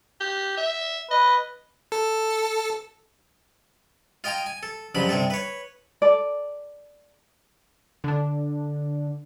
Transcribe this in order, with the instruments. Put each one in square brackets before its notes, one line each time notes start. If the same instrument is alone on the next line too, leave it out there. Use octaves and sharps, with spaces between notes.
[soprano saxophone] G4
E5
[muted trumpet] B4 [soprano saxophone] D#5
[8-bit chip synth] A4
[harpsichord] F4 D#5 G5 G#5 A#5
G#5
A4
C#2 G2 F3 F#3 B5
G2 C3 G#4 A4
B4 C#5
[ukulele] A4 D5
[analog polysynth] D3 D4